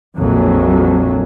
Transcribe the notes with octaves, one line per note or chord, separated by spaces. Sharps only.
A#1 F2 F#3